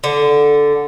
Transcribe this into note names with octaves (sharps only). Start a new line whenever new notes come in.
D3